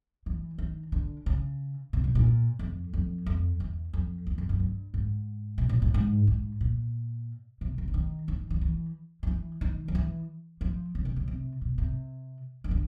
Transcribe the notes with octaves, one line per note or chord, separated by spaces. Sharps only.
E3
D#3
D3
C#3
C3
B2
A#2
F2
F2
F2
E2
F2
E2
F2
F#2
G2
G#2
B2
A#2
A2
G#2
G#2
A#2
C3
C3
D3
D#3
D#3
D#3
E3
F3
E3
D#3
F3
E3
F3
C#3
C3
C#3
C3
B2
C3
D#3
D3